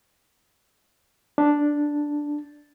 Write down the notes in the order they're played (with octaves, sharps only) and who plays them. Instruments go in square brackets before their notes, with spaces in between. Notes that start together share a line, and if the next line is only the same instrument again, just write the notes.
[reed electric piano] D4